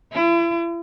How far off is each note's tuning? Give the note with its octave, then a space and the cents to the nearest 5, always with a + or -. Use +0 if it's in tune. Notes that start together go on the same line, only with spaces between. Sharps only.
E4 +40